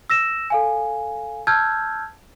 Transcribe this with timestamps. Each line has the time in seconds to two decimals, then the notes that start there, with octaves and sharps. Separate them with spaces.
0.10 E6 A#6 E7
0.50 A4 F5 G#5
1.47 A5 E6 F6 G6 G#6